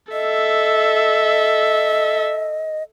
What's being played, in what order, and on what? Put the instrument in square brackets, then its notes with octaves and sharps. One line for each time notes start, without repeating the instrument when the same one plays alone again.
[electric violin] A4 E5 [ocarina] D#5